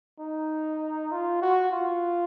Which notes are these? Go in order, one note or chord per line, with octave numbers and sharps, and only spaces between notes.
D#4
F4
F#4
F4